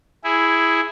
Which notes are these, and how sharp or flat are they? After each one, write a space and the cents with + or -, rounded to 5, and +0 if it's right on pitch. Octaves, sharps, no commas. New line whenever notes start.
E4 +0 G#4 +0